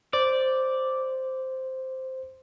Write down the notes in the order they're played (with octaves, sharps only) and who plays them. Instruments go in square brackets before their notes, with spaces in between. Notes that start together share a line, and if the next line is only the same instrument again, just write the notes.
[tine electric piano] C5 [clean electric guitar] D5